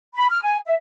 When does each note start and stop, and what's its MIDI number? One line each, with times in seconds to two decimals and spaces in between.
0.15 0.26 83
0.29 0.40 89
0.42 0.57 80
0.66 0.74 76